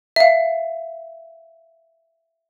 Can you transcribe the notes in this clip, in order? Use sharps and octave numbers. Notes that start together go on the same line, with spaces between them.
E5 F5